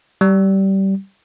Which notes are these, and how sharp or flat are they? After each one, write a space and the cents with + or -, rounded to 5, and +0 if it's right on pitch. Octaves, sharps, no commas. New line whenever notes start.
G3 -20